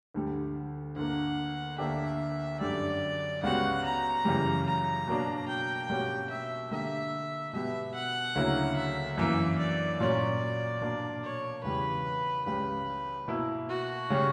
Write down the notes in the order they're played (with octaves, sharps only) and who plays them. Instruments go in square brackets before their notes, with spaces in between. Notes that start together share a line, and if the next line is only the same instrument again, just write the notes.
[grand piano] D2 D3 G3
[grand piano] D2 D3 A#3 [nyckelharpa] F#5
[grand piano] D2 D3 A#3 D4 G4 [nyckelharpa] E5
[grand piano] F#2 D3 G3 [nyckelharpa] D5
[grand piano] C#2 C#3 G3 B3 F#4 [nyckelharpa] F#5
[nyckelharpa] A#5
[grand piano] F#2 C#3 E3 G3
[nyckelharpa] A#5
[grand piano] B2 F#3 A#3 D4
[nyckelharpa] G5
[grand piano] B2 G3 A#3 C#4 F#4
[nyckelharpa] E5
[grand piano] D3 G3 A#3 [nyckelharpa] E5
[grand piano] B2 G3 B3 [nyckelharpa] E5
[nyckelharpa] F#5
[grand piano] D2 C#3 F#3 A#3 E4
[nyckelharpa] E5
[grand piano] F#2 E3 A#3 [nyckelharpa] E5
[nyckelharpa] D5
[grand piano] A#2 F#3 C#4 [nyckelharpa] D5
[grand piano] B2 A#3 D4
[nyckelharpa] C#5
[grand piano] E2 C#3 G3 [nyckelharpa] B4
[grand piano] C#2 C#3 G3 [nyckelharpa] B4
[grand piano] B2 A#3 E4
[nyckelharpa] F#4
[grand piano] C#3 G3 C#4